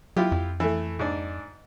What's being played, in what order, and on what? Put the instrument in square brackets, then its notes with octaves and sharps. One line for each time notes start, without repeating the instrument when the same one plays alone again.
[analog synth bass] F#3 [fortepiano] E4 F4 G4
[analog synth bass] F2
[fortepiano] E3 A3
G#2 D4